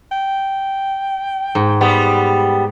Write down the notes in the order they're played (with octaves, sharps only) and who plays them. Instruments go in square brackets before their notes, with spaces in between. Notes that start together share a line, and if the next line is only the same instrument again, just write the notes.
[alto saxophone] G5
[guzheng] G#2
[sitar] G3 B3